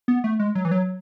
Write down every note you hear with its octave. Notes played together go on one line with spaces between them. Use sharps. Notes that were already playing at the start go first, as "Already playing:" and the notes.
B3
A3
G#3
F#3
E3
F#3